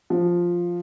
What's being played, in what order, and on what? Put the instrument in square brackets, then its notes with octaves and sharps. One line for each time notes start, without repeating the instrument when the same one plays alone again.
[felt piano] F3